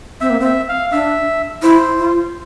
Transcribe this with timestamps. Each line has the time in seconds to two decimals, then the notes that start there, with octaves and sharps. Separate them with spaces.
0.21 C4 E5
0.30 A#3
0.40 C4
0.45 E5
0.69 F5
0.92 D4 E5
1.63 E4 C5
1.98 F4